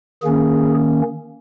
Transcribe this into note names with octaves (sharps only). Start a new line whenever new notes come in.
D#3 A#3 C#4 G#4